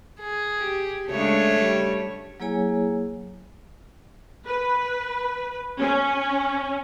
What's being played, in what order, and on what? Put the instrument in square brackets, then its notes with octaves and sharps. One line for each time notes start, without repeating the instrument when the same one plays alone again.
[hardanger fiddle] G#4
[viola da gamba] G4
[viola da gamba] C#3 G#3 D4 [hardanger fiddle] A3 C#5
[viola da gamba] G3
[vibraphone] F#3 A#3 E4 G#4 C#5 G#5
[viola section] B4
C#4